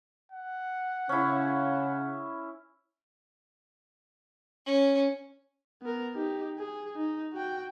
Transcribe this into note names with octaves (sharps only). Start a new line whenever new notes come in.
F#5
C#3 C#4 E4
C#4
B3 A#4
D#4 G4
G#4
D#4
F#4 G5